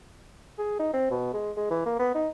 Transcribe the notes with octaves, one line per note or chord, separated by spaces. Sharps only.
G#4
D#4
C4
B2
G#3
G#3
E3
A#3
B3
D#4